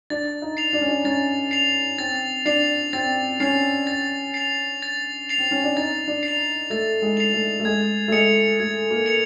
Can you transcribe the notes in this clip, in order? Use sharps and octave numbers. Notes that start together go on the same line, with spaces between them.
D4 A6
D#4
C7 F7
D4
C#4
D4
C#4 A6
C7 F7
C4 A6
D4 C7 F7
C4 A6
C#4 C7 F7
A6
C7 F7
A6
C7 F7
C4
C#4
D4
D#4 A6
D4
C7
F7
A3 A6
G#3
C7 F7
A3
A3
G#3 G#6
A3
G#3 C#7 F7
A3 G#6
A#3
C#7 F7